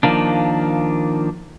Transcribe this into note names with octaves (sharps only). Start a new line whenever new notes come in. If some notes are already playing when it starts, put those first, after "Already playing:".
D#3 F3 A#3 D4